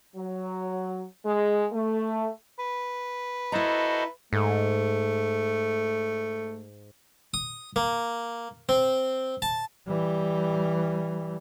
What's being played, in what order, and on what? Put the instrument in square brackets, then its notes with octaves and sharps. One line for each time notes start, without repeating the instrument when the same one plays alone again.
[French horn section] F#3
G#3
A3
[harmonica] B4
[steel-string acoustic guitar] E4 A#5 [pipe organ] F#4 A4 C5 [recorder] D#5
[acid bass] G#2 [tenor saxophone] A3
[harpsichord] D#6
A#3
C4
A5
[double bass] E3 G3